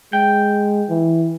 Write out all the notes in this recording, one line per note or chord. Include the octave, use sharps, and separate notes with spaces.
G#3 G5
E3